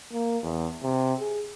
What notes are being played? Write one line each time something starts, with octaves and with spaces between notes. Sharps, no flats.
A#3
E2
C3
G#4